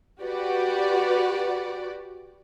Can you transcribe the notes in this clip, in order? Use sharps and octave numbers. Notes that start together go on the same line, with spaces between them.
F#4 G4 B4 D5 F#5